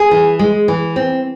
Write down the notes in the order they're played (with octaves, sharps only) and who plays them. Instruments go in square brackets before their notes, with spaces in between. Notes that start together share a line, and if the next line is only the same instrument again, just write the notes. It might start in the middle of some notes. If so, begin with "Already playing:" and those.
Already playing: [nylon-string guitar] G#4
E3
G#3
E3
C4